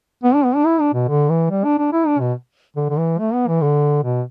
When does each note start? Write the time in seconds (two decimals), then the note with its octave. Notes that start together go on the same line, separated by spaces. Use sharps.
0.24 B3
0.34 D4
0.45 B3
0.56 D4
0.66 E4
0.80 D4
0.94 B2
1.08 D3
1.29 E3
1.50 G3
1.64 D4
1.78 D4
1.93 E4
2.07 D4
2.20 B2
2.76 D3
2.90 D3
2.98 E3
3.19 A3
3.33 B3
3.47 E3
3.61 D3
4.03 B2